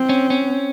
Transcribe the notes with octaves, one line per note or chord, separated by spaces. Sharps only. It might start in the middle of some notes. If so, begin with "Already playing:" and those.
Already playing: C4
C#4
C#4